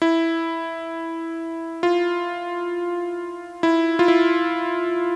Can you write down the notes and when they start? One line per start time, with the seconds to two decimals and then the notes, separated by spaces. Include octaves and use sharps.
0.02 E4
1.83 F4
3.63 E4
3.99 F4
4.08 E4